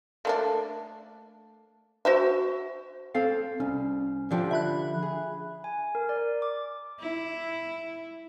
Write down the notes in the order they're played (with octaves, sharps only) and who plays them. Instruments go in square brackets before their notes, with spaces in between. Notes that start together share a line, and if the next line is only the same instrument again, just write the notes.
[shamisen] A3 A#3 D4
F#4 C5 E5
[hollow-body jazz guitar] C4 A4 F5
[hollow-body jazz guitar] C2 [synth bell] C#4
[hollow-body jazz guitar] D3 F3 G4
[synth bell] E5 B5 F#6
[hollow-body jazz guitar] G#4
[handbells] G#5
A#4
D5
D6
[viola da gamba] E4